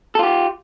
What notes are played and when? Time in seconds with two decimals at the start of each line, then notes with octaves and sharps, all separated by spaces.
0.15 A4
0.19 F4
0.23 G4